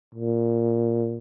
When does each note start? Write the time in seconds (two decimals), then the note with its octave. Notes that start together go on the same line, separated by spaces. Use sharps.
0.15 A#2